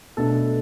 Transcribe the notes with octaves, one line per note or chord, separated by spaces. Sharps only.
B2 A3 D4 A4